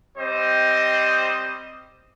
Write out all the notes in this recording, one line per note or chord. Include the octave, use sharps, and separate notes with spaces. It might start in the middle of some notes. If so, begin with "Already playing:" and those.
G3 C4 C5 D#5